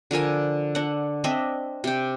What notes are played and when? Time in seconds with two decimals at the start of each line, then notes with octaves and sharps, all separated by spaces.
0.11 D3 F3 A#4 G#5
0.75 D4 F#5
1.24 C4 D4 D#5 E5
1.84 C3 G5